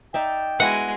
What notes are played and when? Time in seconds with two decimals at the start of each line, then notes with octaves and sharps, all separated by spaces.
0.14 D#4 D5 E5 G5
0.60 G#3 B3 E4 F#4 F#5